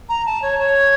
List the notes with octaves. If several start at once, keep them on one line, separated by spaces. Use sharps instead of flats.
A#5
A5
C#5
C#5